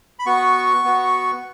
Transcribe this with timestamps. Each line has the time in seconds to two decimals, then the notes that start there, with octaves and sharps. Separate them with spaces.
0.19 B5
0.26 B3 F#4 C#6
0.85 B3 F#4